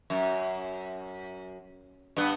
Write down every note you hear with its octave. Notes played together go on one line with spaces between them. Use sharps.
F#2
G2 B3